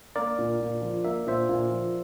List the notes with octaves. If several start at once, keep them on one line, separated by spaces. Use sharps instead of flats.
A#3 A#4 D5
A#2
A#2
F3
A#3 E5
A#2 C5 E5
A#2
F3